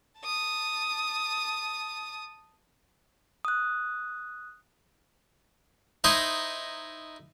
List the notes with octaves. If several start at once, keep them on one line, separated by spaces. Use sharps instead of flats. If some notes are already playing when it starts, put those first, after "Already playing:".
A5 D#6
D#6 F#6
D#4 E4 C5 D#5